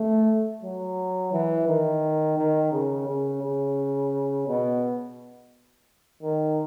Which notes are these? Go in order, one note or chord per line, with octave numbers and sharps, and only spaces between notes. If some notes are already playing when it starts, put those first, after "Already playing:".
Already playing: A3
F#3
E3
D#3
D#3
C#3
C#3
C#3
B2
D#3